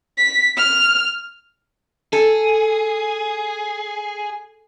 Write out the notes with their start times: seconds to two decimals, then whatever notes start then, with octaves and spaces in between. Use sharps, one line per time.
0.18 B6
0.57 F6
2.13 G#4 A4